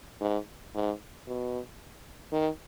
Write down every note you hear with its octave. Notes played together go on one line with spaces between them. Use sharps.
G#2
G#2
B2
D#3